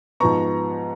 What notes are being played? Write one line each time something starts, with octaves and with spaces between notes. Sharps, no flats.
G#2 F3 B3 A#5 C#6